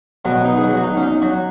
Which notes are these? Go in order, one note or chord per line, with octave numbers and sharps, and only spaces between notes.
B2 F#3 B3 F#4
D#4
G#4
F#3 F#4
F#4
D#4
C#4
D#4
F#3 F#4